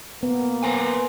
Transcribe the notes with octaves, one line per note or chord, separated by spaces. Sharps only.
A#3 B3
B4 C5 G#5